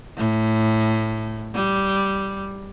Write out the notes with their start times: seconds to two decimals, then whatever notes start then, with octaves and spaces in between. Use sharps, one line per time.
0.17 A2
1.55 G3